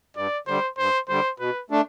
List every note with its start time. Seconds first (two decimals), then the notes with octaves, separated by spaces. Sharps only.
0.16 G2 D5
0.47 D3 G3 C5
0.78 G2 C5
1.09 D3 G3 C5
1.40 B2 B4
1.70 A3 D4